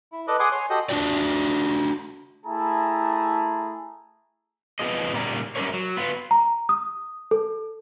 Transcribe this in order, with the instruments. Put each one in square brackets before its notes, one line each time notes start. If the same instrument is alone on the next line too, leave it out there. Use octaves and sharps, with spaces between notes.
[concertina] E4
A4 B4 D5 D#5
G#4 F#5 G#5 C6 D6 D#6
C#5 G#5 C6
F#4 G4 A4 D#5 G5
[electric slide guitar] D4 F4 F#4 D5
[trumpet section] A3 E4 G#4 A5 A#5
[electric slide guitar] F2 F3 B3 F4 G#4 D#5
A#2 C#3 G3 A#3 A#5
F#2 G3 C#4 A4 A#4 C#5
F#3
B3 F4
[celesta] A#5
D#6
A4